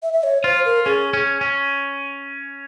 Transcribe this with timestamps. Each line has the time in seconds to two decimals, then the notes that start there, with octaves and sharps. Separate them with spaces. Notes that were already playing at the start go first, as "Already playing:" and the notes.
0.03 E5
0.13 E5
0.23 C#5
0.44 F4 C5
0.65 A#4
0.85 C#4 G#4
1.13 C#4
1.41 C#4